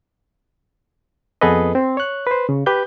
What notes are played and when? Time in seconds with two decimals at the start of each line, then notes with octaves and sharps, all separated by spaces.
1.41 F2 B3 G#4 A4 B4 D#5
1.75 C4
1.97 C#5 F#6
2.27 B4 C5
2.49 C#3
2.66 G4 B4 G6